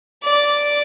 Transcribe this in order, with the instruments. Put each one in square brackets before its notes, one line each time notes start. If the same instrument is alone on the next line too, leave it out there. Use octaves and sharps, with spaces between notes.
[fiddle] D5